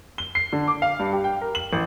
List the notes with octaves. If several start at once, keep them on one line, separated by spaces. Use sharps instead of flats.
G7
C7
D3
D6
F5
G2
G4
G5
A#4
F#7
A1